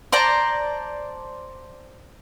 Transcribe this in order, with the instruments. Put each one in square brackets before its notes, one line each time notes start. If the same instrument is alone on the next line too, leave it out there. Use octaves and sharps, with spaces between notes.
[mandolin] C5 D5 A5 A#5